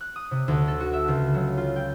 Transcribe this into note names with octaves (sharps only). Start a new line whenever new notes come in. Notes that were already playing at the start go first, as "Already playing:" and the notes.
F#6
D#6
C3
D2
A4
F#4
E5
C#2
F#3
F4
G5